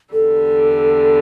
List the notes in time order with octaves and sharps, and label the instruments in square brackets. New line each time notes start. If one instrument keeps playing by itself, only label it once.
[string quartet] E2 D3 G3 [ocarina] A4